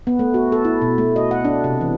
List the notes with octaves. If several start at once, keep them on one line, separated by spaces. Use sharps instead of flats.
B3
A3
F#4
A4
E4
B2
A3
D#5
F#5
D4
C3
E3